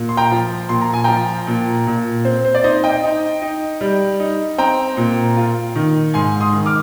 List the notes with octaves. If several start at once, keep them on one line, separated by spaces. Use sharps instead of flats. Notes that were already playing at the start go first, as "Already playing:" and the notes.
Already playing: A#2
C6
G5 A#5
F3
A#2 C6
A#5
G#5
F3 G5 A#5
A#2
A#2
C4 C5
C5
D5
D#4 C5 D#5
D#5 G5
D#4
D#4
G3
D#4
C4 G5 A#5
A#2
F4
D#3
G#2 G#5 C6
C6 D#6
D#3
D6 F6